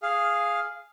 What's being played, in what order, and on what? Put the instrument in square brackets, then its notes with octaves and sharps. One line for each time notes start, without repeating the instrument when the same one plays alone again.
[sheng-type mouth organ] G#4 F5